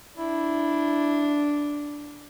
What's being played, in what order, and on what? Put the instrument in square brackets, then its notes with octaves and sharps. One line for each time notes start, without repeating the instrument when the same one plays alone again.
[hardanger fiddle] D4 [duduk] E4